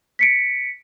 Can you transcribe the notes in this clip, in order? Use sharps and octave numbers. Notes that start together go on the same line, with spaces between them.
B6 C#7 D7